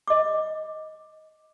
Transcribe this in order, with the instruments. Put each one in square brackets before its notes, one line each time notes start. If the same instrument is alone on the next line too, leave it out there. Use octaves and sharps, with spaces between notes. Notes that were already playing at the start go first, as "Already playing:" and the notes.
[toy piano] D#5 D6